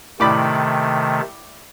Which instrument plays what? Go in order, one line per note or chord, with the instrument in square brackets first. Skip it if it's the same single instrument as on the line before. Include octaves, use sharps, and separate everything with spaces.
[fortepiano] A2 D5 B5 [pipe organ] C3 D#3 A3